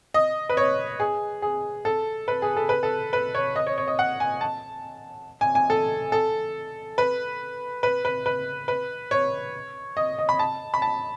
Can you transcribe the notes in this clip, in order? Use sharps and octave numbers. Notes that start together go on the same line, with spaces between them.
D#5
B4
C#5
G#4
G#4
A4
B4
G#4
A4
B4
A4
B4
C#5
D#5
C#5
C#5
D#5
F#5
G#5
A5
G#5
G#5
A4
A4
B4
B4
B4
B4
B4
C#5
D#5
D#5
B5
A5
B5
A5